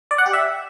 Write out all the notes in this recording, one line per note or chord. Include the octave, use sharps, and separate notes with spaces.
D5
F#5
G4
E5